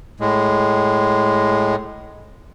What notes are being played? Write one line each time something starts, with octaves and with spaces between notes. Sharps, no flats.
A2 G#3